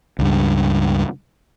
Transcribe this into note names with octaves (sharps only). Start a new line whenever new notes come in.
C#2 G2